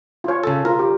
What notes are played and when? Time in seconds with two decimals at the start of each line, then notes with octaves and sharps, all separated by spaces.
0.24 F4 C#5
0.43 C#3 A4
0.65 F4 A#4
0.79 G4